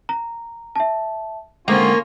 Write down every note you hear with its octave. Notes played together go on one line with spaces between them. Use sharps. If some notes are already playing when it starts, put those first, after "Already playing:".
A#5
E5 A5
G#2 D3 A#3 C4 C#4 F4 D6